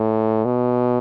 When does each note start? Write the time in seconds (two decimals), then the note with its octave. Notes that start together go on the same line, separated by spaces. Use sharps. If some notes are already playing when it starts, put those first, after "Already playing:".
Already playing: A2
0.45 B2